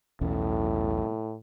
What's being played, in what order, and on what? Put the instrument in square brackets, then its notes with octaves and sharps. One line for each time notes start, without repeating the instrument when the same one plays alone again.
[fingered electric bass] B1 E2 C#4 [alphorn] A2